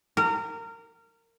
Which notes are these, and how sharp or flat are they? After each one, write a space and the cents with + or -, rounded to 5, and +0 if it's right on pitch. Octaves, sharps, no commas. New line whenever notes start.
A#4 -25